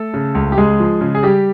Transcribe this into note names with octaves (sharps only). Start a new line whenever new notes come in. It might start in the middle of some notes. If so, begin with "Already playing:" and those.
Already playing: A3 A4
C#3
C#2
G4
C#2 G#3 G#4
F3
C#3
G#4
G3 G4